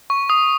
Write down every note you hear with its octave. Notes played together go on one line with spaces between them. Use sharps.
C#6
D#6